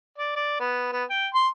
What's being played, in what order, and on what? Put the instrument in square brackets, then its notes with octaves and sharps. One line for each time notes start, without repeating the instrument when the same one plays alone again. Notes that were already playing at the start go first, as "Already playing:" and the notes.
[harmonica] D5
D5
B3
B3
G5
C6